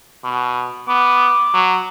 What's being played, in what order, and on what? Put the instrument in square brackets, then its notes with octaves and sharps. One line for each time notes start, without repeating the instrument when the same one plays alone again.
[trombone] B2
[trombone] B3 [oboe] D6
[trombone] F#3